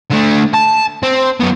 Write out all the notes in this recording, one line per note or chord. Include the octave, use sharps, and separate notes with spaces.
D3 A3
A5
C4
F#2 B3